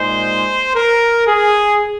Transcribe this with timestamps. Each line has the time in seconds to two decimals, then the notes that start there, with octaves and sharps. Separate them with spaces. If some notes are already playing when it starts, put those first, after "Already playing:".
Already playing: A#2 G#3 D#4 C5
0.76 A#4
1.27 G#4